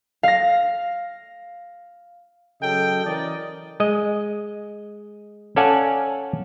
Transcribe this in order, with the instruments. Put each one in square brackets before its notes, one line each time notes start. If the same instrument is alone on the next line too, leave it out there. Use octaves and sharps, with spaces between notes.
[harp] F5 A#6
[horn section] C#3 F#3 A4 D#5 G5
E3 C#4 A#4 D5 D#5
[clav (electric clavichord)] G#3 D#5
C#4 A4 D5 F5 F#5 G#5